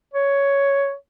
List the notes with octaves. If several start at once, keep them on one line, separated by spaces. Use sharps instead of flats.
C#5